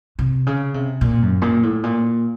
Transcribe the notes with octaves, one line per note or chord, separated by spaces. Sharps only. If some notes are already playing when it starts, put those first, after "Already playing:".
C3
C#3
C3
A#2
F#2
A#2
A2
A#2